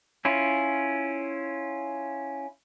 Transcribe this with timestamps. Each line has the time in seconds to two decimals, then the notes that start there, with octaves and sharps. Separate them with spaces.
0.25 C#4 E4 F4